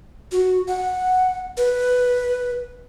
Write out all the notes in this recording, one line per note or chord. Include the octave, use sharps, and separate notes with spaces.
F#4
F#5
B4